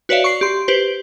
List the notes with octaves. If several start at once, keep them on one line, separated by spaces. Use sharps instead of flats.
F#4 B4 C#5 D5 E5 F5
C#6 C7
G4 C6
G4 B4 C5